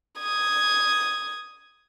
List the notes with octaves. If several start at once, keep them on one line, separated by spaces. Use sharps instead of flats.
D#6 G#6